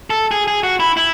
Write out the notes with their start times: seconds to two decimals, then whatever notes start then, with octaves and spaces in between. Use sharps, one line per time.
0.10 A4
0.31 G#4
0.48 G#4
0.63 F#4
0.80 E4
0.97 E4